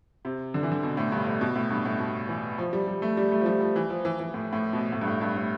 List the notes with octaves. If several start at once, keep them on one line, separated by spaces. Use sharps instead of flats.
C3
D3
E3
D3
B2
A2
G2
A2
B2
A2
G2
A2
B2
E3
F3
G3
G3
A3
G3
A3
F3
G3
F3
E3
F3
E3
E3
A2
A2
B2
A2
G2
A2
G2
A2